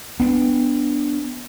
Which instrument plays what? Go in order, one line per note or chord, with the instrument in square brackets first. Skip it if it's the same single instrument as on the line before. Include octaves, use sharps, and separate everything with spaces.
[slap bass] B3 D4